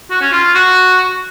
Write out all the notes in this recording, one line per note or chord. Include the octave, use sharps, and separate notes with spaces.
F#4
C#4
F4
F4
F#4